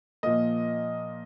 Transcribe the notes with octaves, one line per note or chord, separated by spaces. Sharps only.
A#2 F3 A#3 D#5